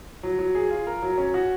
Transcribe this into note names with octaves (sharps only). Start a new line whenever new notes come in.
F#3
F#3
G#4
F4
A#4
F#3
C#4
F#4